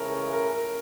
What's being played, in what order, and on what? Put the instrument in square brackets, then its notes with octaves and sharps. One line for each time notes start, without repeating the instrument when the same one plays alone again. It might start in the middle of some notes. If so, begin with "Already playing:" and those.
Already playing: [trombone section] C#2 C#3 E3 A3 C#4 [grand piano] A#4
[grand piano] A#4